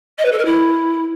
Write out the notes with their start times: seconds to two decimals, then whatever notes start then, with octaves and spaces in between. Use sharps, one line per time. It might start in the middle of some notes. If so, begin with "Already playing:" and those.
0.18 D#5
0.25 B4
0.32 A4
0.38 A#4
0.45 E4